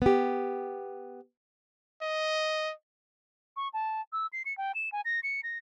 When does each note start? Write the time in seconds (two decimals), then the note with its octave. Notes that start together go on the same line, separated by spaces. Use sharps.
0.02 B3 G4
2.02 D#5
3.56 C#6
3.73 A5
4.12 E6
4.33 C7
4.45 C#7
4.57 G5
4.75 E7
4.92 G#5
5.05 A#6
5.23 C#7
5.43 A#6